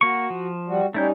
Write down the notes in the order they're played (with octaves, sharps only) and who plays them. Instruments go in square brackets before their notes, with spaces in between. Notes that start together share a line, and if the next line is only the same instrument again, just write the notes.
[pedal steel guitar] A#3 C#6 [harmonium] F#4
[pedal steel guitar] F3
[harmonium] G3 F#4
[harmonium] G3 C#4 D#4 [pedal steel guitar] A3 E4 G6